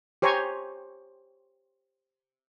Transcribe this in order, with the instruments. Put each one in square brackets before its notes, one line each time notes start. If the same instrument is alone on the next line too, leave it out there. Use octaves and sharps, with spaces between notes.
[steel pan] G4 C5 C#5 G#5 A#5 C#6